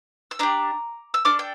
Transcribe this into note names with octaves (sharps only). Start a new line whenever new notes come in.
E6
D4 G4 A#5 D6
E6
D4 A4 D6 F6
G5